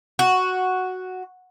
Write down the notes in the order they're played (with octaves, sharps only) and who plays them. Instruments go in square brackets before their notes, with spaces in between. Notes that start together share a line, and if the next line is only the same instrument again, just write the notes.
[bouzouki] F#4